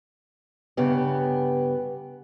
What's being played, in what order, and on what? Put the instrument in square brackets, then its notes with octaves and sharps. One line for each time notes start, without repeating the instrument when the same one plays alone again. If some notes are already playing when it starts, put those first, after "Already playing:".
[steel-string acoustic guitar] G2 C#3 B3 G4